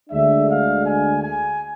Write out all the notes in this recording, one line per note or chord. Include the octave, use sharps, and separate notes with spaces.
D2 D3 G#3 D4 E5
F5
G#5
G#5